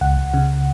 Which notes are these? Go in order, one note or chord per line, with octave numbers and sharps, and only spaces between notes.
C#2 F#5
C#2
C#3